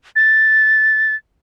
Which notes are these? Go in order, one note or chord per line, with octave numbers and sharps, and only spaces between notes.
A6